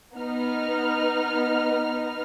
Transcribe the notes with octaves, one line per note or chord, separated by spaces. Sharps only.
B3 D#4 F6